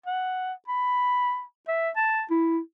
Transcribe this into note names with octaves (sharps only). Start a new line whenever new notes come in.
F#5
B5
E5
A5
E4